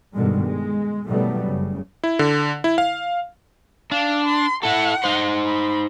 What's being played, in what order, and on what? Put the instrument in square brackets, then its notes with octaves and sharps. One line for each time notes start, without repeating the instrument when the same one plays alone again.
[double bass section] G2 B2 D3 D#3 G3 G#3
G#3
B2 D#3 F#3 G3 A3 B3
F#1 C#3
[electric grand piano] E4
D3
E4
F5
[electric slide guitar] D4 [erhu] F5
[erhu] C6
[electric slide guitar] E4 A4 [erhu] F#5
[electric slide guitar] D#4 C5
[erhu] B5